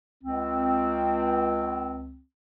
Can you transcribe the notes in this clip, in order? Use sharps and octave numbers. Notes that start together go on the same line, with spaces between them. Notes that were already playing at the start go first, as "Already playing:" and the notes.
C#2 C4